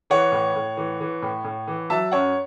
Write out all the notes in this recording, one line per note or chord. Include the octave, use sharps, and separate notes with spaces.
E3 C#5 F#5
A2
A2
E3
E3
A2
A2
E3
F#3 E5 A5
F#2 C#5 F#5